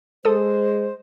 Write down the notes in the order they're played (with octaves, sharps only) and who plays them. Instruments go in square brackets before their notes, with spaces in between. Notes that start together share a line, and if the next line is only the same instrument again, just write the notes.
[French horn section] G#3 [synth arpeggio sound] A4 D#6 [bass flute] C5